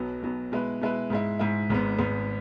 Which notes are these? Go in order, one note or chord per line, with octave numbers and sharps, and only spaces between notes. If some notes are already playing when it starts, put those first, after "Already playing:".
Already playing: B1 B2 F#3 B3
B1 B2 F#3 B3
B2 G#3 E4 B4
B2 G#3 E4 B4
G#2 G#3 E4
G#2 G#3 E4
G#1 G#2 G#3 B3
G#1 G#2 G#3 B3